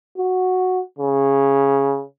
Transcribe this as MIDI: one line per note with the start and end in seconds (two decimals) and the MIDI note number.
0.18 0.81 66
0.99 2.03 49